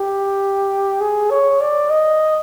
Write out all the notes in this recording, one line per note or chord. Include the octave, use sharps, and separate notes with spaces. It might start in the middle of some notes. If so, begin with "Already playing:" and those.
Already playing: G4
G#4
C#5
D5
D#5